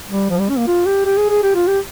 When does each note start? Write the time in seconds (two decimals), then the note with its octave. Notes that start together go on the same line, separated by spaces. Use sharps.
0.11 G3
0.30 F3
0.40 G3
0.49 C#4
0.58 A#3
0.68 F4
0.87 G4
1.05 G4
1.17 G#4
1.30 G#4
1.43 G4
1.55 F4
1.68 G4